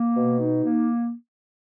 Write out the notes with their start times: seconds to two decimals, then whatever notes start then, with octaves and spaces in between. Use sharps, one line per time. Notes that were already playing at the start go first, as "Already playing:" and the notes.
Already playing: A#3
0.17 B2
0.40 D#4
0.62 A#3